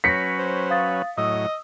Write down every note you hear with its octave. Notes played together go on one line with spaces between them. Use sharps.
F#3 C#4 B4 G6 A#6 B6 C#7
C5
F5 D#6 A6
A2 F#3 D#5 D#6 E6